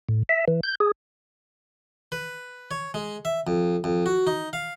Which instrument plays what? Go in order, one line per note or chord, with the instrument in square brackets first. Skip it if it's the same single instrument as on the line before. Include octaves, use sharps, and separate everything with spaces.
[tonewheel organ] A2
E5
E3
G6
G#4
[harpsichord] B4
C#5
G#3
E5
F2
F2
F#4
D#4
F5